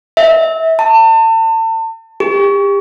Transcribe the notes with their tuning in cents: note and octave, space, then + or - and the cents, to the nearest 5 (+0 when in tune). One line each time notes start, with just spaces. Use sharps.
E5 -30
A5 +35
G4 +35